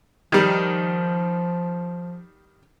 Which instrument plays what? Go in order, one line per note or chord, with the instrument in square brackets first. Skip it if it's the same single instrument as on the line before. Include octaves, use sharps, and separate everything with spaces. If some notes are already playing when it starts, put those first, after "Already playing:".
[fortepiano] D#3 G3 [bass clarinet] F3